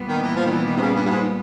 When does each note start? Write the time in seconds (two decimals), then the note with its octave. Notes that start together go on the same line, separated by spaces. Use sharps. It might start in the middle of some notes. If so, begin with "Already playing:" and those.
Already playing: A#2 G3 B3
0.08 D#3
0.22 E3
0.36 F3
0.45 D#3
0.51 E3
0.65 D#3
0.76 C3
0.80 C#3
0.95 G2
1.06 G2
1.09 G#2